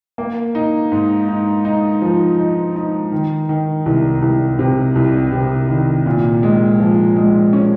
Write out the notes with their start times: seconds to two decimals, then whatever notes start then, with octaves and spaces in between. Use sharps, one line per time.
0.18 A#3
0.55 D#4
0.92 G#2
1.28 D#4
1.65 D#4
2.02 F3
2.39 D#4
2.76 D#4
3.12 D#3
3.49 D#3
3.86 C2
4.22 C2
4.59 C3
4.96 C2
5.32 C3
5.69 D#3
6.06 A#2
6.43 G#3
6.80 F3
7.16 G#3
7.53 C#4